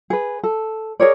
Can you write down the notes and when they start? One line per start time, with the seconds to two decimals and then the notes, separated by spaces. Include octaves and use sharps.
0.10 G#4 B4
0.43 A4
1.00 G#4 A#4 C#5 D5